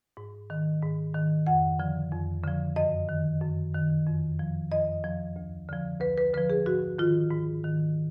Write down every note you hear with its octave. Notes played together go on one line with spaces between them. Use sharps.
G#2
D#3
G#2
D#3
F2 F#5
D3 F3
F2
D3 F3
F#2 D#5
D#3
F#2
D#3
F2
F3
F2 D#5
F3
D2
D3 F3
D2 B4
B4
D3 F3 B4
G#4
G#2 F#4
D#3 F4
G#2
D#3